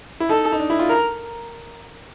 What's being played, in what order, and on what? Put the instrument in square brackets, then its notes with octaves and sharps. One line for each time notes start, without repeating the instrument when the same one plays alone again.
[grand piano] E4
[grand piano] D#4 [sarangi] A4
[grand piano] D#4
D4
E4
F4
[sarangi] A#4